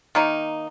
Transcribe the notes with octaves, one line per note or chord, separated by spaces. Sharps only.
D#3 A#3 D#4